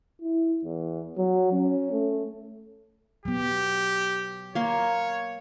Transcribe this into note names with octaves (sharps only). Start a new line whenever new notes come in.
E4
E2
F#3
C#4
A3
F#3 B3 G4
A#3 C#5 C6